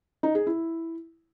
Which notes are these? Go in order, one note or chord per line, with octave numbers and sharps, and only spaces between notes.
D#4
G#4
E4